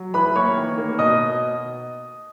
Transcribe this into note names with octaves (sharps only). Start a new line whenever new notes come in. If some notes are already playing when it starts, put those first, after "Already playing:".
Already playing: F#3
E3 B4 B5
A#3 C#5 C#6
D#3
A#3
B2 D#5 D#6